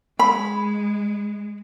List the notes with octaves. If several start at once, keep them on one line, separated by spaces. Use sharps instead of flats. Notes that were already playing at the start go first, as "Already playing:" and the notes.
G#3 B5